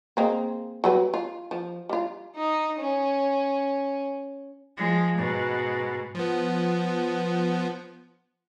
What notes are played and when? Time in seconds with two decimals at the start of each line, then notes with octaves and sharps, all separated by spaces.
0.17 G#3 A#3 C4
0.84 F#3 G3 B4
1.14 F4
1.51 F3
1.89 G3 F4
2.36 D#4
2.79 C#4
4.77 F3 G#3
5.18 G#2 B2
6.15 F3 B3